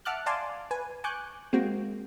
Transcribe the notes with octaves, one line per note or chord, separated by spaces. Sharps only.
E5 F#5 A5 D6 F6 F#6
D5 F5 G#5 A5 C6 D6
B4 G#5
G#5 C#6 D6 F#6 G6
G#3 A#3 C4 F#4 G5